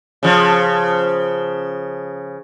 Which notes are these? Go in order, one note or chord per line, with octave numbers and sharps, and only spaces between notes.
C#3 F3